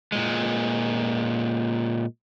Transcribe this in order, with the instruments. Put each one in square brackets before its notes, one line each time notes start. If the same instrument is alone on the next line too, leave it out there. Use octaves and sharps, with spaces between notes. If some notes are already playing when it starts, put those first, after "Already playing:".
[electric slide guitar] A#2 G#3